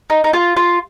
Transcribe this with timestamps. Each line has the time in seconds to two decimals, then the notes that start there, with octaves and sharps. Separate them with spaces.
0.10 D#4
0.24 D#4
0.33 F4
0.57 F4